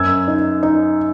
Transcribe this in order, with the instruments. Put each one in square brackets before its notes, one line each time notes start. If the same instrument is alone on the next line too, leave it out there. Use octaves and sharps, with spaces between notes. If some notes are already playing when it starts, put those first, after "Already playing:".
Already playing: [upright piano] F#2 E6 G#6
D#4
D#4